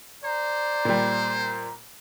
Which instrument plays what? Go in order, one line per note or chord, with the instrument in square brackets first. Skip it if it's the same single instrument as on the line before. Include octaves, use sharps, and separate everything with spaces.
[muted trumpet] C5 [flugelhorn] D5 [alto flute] A#5
[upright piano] A#2 G3